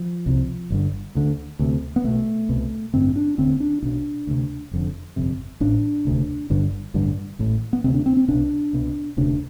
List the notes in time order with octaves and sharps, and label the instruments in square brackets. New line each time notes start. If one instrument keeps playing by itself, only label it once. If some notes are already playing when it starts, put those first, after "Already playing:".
Already playing: [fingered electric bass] F3
C2 C3
G1 G2 D3
D2 D3
D2 C3
B3
B1 B2 A3
C2 B2
A1 G2 D3 C4
D4
E1 D2 D3 C4
D4
B1 B2 D4
D2 C3
F1 F2 D3
G1 F2 C3
A1 A2 D4
E1 D2 C3
G1 G2 D3
A1 G2 D3
A1 A2
B3
D2 C3 C4
D4
C4
C4
C2 B2 D4
C2 B2
E1 D2 C3 D4